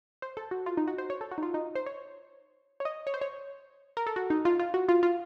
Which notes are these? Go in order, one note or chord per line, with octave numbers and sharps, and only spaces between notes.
C5
A4
F#4
F4
D#4
F#4
C5
C#5
A4
F#4
D#4
F4
D#4
C5
C#5
C#5
D#5
C#5
C5
C#5
A#4
A4
F#4
D#4
F4
F4
F#4
F4
F4